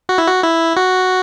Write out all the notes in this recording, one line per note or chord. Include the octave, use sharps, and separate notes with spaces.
F#4
E4
F#4
E4
F#4